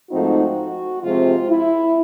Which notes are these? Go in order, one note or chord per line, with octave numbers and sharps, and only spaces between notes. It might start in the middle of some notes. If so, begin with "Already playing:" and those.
G#2 F3 A3 C4 D#4 F#4
C3 F3 G#3 C4 F4
E4